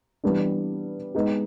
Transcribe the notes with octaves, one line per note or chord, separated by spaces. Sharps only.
E3 G3 B3 D4
G#3 B3 D#4 G#4